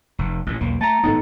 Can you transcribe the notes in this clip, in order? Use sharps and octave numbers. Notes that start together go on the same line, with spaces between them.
F1
A1 A#2
B1 E2 A#3
A3 A5 A#5
G#1 A2 B3 D#4 A4